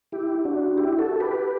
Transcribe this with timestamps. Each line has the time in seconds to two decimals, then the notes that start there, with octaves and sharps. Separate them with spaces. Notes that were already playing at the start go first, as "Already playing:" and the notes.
0.12 E4 G4
0.45 D4 F#4
0.78 E4 G4
0.99 F#4 A4
1.16 A4
1.20 G4 B4